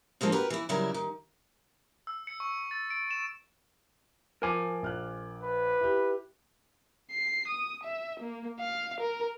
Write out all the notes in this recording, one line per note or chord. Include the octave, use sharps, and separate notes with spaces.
D3 F3 G#3 A#3 C4
F#4 G4 A#4 B4
E3 E4
C#3 F#3 G3 E4 A#4
D#3
E6
C#7
C#6
A6
D7
E7
F3 A#4 G#5 D6
A#1 F6 F#6
B4
E4 G4
C7
D#6
E5
A#3
F5
A#4